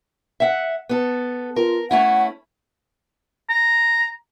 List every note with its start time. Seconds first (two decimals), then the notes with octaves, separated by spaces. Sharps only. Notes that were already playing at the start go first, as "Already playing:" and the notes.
0.40 E5 F#5
0.89 B3 A4
1.56 F4 A#4
1.91 A3 C#4 E4 F#5
3.49 A#5